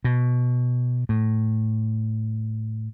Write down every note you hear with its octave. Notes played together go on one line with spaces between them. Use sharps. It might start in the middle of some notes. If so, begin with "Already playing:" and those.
B2
A2